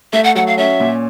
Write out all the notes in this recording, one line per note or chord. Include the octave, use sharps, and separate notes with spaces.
A3 E5
F#5
F#3 F#5
F5
C#4 E5
A#2